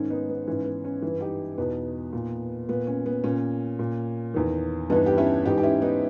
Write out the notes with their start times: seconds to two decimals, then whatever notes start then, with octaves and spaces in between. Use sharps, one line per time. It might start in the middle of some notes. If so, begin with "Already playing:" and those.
Already playing: G#2 D#3 C#4
0.10 B3 D#4
0.29 B3
0.47 G#2 E3 C#4
0.66 B3
0.85 C#4
1.02 G2 E3
1.21 D#4 G4
1.58 E2 B2 B3 D#4
2.13 A#2
2.69 A#2 B3
2.87 C#4
3.06 B3
3.24 A#2 C#4
3.79 A#2
4.34 E2 D#3
4.90 G2 E3 B3 D#4
5.06 G4
5.18 C#4 E4
5.45 G#2 E3 D#4 G4
5.58 G4
5.63 C#4 E4
5.82 B3 D#4